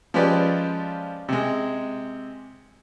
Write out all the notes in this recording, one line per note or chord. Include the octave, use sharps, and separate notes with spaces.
F3 G#3 C#4 G4 B4 D5
C3 G#3